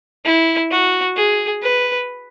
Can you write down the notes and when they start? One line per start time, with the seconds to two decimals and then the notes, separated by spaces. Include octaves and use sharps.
0.25 E4
0.71 F#4
1.16 G#4
1.62 B4